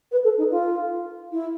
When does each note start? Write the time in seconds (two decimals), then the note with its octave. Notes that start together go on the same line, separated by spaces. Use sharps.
0.11 B4
0.24 A4
0.37 D#4
0.51 F4
1.32 E4